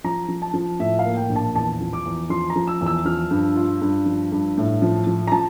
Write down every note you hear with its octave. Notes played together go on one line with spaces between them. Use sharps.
F3 A#5
F3
A5
F3
A2 E5
F5
A#3
G5
A#1
A5
E2 A5
F3
D6
E2
F3 C6
A#5
F3
E6
E2
E6
F3 F6
G2
F4
G2
F3
G2
A2
F3
F3
A#5
F3 A5